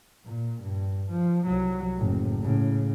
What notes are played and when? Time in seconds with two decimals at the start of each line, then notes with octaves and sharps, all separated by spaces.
0.24 A#2
0.62 G2
1.11 F3
1.45 C2 F#3
1.96 F#1 A2
2.42 A2 C#3